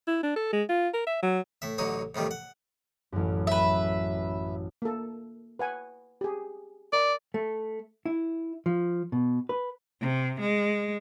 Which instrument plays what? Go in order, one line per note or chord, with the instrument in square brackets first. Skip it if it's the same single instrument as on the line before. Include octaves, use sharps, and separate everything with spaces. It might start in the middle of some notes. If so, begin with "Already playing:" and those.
[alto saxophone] E4
D4
A4
G#3
F4
A#4
E5
F#3
[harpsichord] A2 E5
A1 D3 F#3 D#4 C#5
F2 A2 D#3 G3
F#5
[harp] A1 F#2
[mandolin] B4 E5
[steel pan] A#3 A4
B4 F#5 G#5
G4 G#4
[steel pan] A#4 D#5 [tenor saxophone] D5
[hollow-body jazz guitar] A3
E4
F3
B2
B4
[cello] C3
G#3